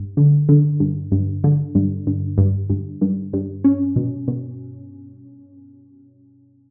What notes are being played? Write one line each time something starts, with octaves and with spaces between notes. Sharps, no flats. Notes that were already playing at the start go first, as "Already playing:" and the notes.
Already playing: G2
D3
D3
G2
G2
D3
G2
G2
G2
G2
G2
G2
C#4
B2
B2